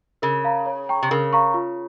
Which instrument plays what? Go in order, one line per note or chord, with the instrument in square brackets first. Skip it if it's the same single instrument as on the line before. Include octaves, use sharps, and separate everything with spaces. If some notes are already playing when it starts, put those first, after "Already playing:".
[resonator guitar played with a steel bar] C#3 [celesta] A#4
[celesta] F5 A#5
C#5
G5 A#5 C#6
[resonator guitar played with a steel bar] C3
[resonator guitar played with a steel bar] C#3 [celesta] A#4
[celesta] F5 A#5 C#6
F4